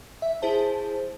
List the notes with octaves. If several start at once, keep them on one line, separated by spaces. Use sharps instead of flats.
E5
E4 G#4 C5 A5